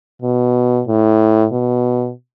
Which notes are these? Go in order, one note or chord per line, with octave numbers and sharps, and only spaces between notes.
B2
A2
B2